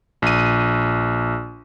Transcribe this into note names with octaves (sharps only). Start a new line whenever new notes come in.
A#1 D#7